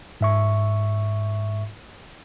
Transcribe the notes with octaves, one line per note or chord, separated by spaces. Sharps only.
G#2 E5 C#6